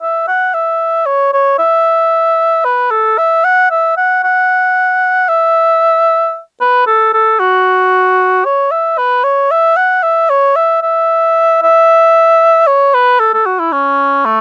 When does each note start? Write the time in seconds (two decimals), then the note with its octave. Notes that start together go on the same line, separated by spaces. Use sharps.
0.02 E5
0.28 F#5
0.54 E5
1.06 C#5
1.33 C#5
1.59 E5
2.65 B4
2.91 A4
3.18 E5
3.44 F#5
3.71 E5
3.97 F#5
4.24 F#5
5.29 E5
6.61 B4
6.87 A4
7.14 A4
7.40 F#4
8.45 C#5
8.71 E5
8.98 B4
9.24 C#5
9.51 E5
9.77 F#5
10.03 E5
10.30 C#5
10.56 E5
10.82 E5
11.62 E5
12.67 C#5
12.94 B4
13.20 A4
13.34 A4
13.46 F#4
13.59 E4
13.72 C#4
14.25 A3